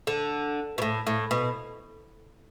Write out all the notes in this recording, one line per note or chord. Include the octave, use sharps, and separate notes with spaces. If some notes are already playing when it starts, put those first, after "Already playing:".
D3
B2
A2
A2
B2